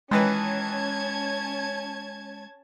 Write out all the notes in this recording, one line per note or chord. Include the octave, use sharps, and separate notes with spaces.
D#3 E3 G#3 C#4 B4 A5 G#6